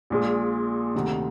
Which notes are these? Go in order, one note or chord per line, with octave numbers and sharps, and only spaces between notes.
A#1 A#2 G#3
D2 C3 D#3